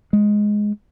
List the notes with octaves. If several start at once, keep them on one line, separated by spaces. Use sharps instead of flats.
G#3